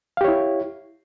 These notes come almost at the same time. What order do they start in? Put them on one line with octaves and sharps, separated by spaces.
F5 G4 C#5 E4